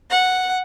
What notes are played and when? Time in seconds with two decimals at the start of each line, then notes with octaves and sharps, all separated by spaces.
0.10 F#5